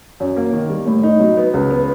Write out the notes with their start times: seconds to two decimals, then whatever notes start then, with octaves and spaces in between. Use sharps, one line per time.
0.20 F#2
0.36 A#3
0.53 D#3
0.70 G3
0.86 A2
1.03 D#4
1.20 F#3
1.37 B3
1.54 C#2
1.70 B3